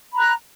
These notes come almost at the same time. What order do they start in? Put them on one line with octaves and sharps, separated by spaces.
B5 A#5 F#6